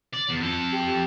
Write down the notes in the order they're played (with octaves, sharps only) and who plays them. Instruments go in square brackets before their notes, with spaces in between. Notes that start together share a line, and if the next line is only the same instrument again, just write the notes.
[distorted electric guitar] D5
E2
F2 A4
[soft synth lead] G4